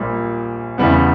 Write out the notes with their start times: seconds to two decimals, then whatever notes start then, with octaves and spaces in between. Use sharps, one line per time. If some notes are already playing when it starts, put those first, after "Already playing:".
Already playing: A#1 A#2 G3
0.78 E2 C#3 E3 G3 B3